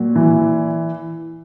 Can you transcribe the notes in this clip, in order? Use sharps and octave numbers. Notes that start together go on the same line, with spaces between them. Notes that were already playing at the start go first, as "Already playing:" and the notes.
Already playing: A#2 F#3
E3